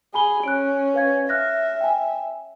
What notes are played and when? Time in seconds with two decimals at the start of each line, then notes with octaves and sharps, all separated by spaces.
0.14 G#4 G#5 B5 G7
0.43 C#4 F#6 D7
0.94 B4 F5 G#6
1.29 E5 F6 F#6 A#6
1.81 G5 G#5